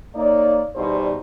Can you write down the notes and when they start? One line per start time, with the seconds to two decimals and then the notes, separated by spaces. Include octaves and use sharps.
0.15 A#3 D#4 C#5 D5
0.75 E2 B2 G3 D#4 C5 D5